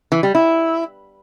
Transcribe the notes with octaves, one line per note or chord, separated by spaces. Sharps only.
E3
G3
E4